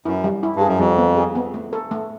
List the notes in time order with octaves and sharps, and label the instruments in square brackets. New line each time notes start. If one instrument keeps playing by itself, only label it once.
[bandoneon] F#2 [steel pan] E4
[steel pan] G3
E4
[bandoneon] G2
[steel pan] G#4
[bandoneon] F#2
[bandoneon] F2 [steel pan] G3
[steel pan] B3
G#4
B3
A3
A4
A3